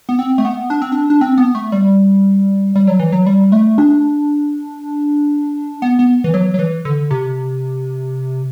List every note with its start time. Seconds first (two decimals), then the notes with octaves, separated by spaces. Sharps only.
0.09 B3
0.19 C4
0.38 A3
0.45 B3
0.70 D4
0.82 C4
0.92 D4
1.10 D4
1.21 C4
1.38 B3
1.55 A3
1.72 G3
2.76 G3
2.87 F#3
2.99 E3
3.12 F#3
3.27 G3
3.52 A3
3.78 D4
5.82 B3
5.99 B3
6.24 E3
6.34 F#3
6.54 F#3
6.59 E3
6.85 D3
7.11 C3